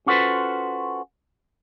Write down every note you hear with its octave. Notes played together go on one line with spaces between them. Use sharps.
C#4 F4 F#4 A4 B4 C5